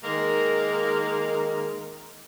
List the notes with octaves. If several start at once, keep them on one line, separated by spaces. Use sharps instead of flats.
D#3 G#3 A#3 A#4